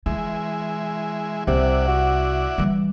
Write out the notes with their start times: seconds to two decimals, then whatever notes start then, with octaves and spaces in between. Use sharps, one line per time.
0.06 E3 G#3 E4
1.47 C2 C3 E4 D5 F#5
1.88 F#4
2.58 E3 G3